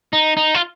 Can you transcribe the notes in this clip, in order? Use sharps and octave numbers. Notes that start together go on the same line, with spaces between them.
D#4
D#4
F4